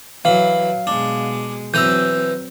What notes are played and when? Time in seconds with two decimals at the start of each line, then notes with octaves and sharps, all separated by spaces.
0.25 E3 F#3 F5 B5
0.87 B2 G#3 D4
1.74 E3 F#3 C4 B4 A#5 E6 G6